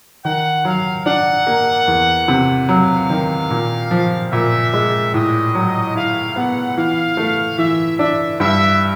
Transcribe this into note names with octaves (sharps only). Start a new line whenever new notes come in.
D#3 F#5
F#3 F5
D4 F#5
A#3
E2
C3
F#3 F5
D#3
A#2
F3
A#2 E5
G#3
A2 D#5
F#3
E4 F5
B3 F#5
E3 F5
A3
E3 E5
D4 E5
G2 E5